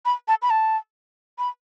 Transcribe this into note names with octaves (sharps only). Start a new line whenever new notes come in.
B5
A5
B5
A5
B5